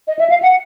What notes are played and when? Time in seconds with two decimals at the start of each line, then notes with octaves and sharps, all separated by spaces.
0.08 D#5
0.19 E5
0.30 F5
0.42 F#5